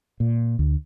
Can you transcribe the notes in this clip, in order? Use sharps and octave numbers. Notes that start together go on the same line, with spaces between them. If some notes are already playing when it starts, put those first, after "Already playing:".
A#2
D2